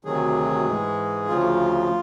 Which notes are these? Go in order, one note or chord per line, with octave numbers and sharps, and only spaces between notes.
D2 C3 D#3 F#3 G#4
G#2 E3 G#3
D2 C#3 F3 F4